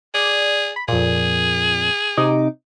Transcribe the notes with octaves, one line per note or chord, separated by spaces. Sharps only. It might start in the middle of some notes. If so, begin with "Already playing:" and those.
G#4 D5
B5
F2 A#2 G#4
C3 D#4 D6